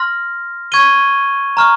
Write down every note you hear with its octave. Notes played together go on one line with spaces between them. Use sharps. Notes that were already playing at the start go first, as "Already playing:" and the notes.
Already playing: C6 F6 A#6
C#6 G#6 D#7 G7
A#5 C#6 F6